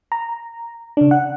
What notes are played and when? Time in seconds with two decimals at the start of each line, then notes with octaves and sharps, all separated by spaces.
0.12 A#5
0.97 C#3 D4
1.11 F#5